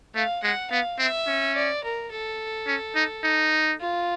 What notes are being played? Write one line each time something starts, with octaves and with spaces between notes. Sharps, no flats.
A3 F5
G#3 F#5
B3 F5
C4 E5
C#4
D5
A#4
A4
C#4
D#4
D#4
F4